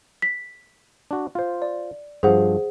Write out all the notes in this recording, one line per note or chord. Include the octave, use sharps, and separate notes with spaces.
B6
D4 F#4
F4 C5
D5
G2 F3 G#4 C5 F#5